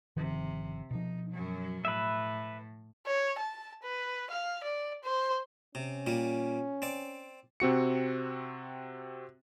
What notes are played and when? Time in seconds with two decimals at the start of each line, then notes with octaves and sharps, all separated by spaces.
0.17 G1 C3 D#3 F3
0.91 B2 F3 D#4
1.30 F#2 F#3
1.85 A2 B4 E5
3.06 C#5
3.38 A5
3.83 B4
4.30 F5
4.63 D5
5.04 C5
5.75 C3 C#4
6.07 A#2 G3
6.82 C4 D5
7.60 C3 C4 F#4 C#7